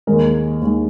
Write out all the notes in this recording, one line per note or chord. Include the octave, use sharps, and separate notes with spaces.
D#2 D#3 G#3 A#4
D#2 D#3 G#3